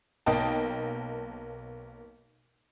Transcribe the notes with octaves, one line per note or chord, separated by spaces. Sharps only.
B1 A#3 D#5 G5 A5